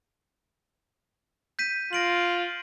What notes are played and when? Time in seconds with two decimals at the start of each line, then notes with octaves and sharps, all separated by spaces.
1.59 G6 B6 D#7
1.93 F4 A#6 D7 F#7